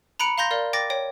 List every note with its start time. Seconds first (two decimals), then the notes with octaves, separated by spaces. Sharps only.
0.19 A#5 B5 F#6 C#7 D7
0.38 F5 A#5 C6 G6 A#6
0.51 A#4 D5 F5
0.73 G5 D6 A6 A#6
0.90 C#5 G5